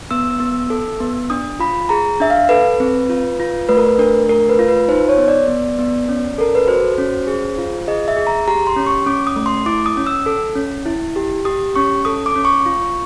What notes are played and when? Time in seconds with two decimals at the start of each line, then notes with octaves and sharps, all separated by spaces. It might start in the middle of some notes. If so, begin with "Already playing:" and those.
0.11 B3 E6
0.40 B3
0.70 A4
1.00 B3
1.30 D4 D#6
1.60 F4 B5
1.89 G#4 A#5
2.20 D4 E5
2.30 F5
2.49 A4 B4
2.80 C4
3.10 F4
3.40 F4
3.69 A3 B4
3.77 A#4
3.86 B4
3.99 D4 A#4
4.29 A3 A#4
4.49 B4
4.59 F4
4.68 B4
4.88 D#4 C5
5.09 C#5
5.18 B3
5.28 D5
5.48 B3
5.79 B3
6.09 C#4
6.38 A4 A#4
6.55 B4
6.67 F#4 C5
6.98 C#4
7.27 G#4
7.58 F4
7.88 G#4 D#5
8.08 E5
8.17 G#4
8.27 A#5
8.48 G4 A#5
8.67 C6
8.76 C#4
8.86 C#6
9.06 C#4 D6
9.27 D#6
9.36 A3
9.46 C6
9.66 E4 D6
9.86 D#6
9.97 C#4
10.07 E6
10.26 A4
10.56 C#4
10.86 E4
11.16 G4
11.45 G4 D#6
11.76 C#4 C#6
12.05 A4 D#6
12.26 D6
12.36 C#4
12.45 C#6
12.66 F4